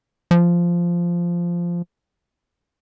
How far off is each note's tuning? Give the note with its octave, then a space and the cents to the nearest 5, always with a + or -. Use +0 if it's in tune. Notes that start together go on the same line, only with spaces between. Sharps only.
F3 -10